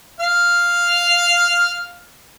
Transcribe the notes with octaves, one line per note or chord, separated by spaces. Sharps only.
F5 F6